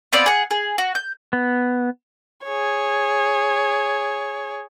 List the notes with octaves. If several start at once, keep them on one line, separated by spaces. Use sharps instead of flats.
B3 C4 D5 F5
G#4 F#5
G#4
F#4
G6
B3
G#4 C#5